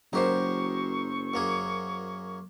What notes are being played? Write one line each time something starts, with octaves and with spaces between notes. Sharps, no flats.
F#1 F#3 D#4 G4 A#4 C5 C#6
F#2 A#3 G#4